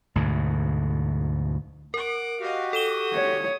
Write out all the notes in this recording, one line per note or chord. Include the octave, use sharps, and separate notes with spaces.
D2 G#2 B2
A#4 F#5 D6
F#4 G4 D#5 F5
A4 D#6 E7 G7
C#5